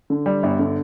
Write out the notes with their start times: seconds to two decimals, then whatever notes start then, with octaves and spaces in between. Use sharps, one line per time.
0.10 D3
0.26 G3
0.43 G1
0.59 D3